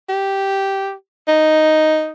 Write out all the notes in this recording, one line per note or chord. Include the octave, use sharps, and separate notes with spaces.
G4
D#4